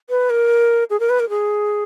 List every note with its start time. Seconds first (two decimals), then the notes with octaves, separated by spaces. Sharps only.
0.10 B4
0.30 A#4
0.90 G#4
1.00 A#4
1.10 B4
1.20 A#4
1.30 G#4